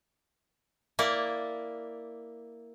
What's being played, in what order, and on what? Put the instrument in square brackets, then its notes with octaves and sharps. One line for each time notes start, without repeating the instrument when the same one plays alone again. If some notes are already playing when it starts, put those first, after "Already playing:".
[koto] A#3 E4 D5